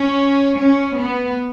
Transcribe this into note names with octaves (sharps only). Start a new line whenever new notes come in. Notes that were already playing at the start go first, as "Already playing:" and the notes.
Already playing: C#4
C#4
B3